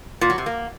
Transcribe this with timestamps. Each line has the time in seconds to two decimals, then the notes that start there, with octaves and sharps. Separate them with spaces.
0.21 A#2
0.30 F#3
0.38 C3
0.46 A#3